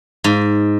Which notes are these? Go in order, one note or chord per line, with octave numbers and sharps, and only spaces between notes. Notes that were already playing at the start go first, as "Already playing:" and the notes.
G#2